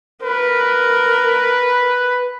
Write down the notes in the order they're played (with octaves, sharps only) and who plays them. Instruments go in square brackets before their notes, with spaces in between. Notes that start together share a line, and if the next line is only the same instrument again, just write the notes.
[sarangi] A#4 [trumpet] B4